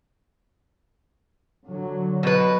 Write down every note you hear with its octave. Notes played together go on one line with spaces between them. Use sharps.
D3 F#3
B2 B4